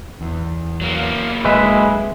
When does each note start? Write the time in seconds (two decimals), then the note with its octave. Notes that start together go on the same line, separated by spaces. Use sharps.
0.21 E2
0.81 F#3 A#3
1.44 D1 G#3 B4 E5